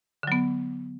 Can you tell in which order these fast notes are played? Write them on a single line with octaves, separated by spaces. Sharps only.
D3 F#3 B3